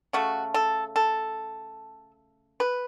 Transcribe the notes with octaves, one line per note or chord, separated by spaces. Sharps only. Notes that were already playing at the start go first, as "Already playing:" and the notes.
C#3 A3 F#4
A4
A4
B4